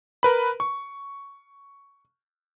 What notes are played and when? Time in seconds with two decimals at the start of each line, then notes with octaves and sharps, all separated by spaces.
0.23 A#4 B4 B5
0.60 C#6